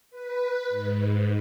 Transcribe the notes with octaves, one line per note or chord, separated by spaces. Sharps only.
B4
G#2